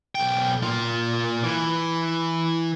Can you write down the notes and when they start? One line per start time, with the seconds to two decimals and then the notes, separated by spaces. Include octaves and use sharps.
0.15 B1 G5
0.62 A#2 F4
1.44 E3